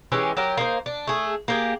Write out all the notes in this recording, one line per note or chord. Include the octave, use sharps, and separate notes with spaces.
E3 G#3 C#4 G4
F#3 G4 A#4
A#3 D#4 C5
D4
A3 G#4
A#3 G4 G#4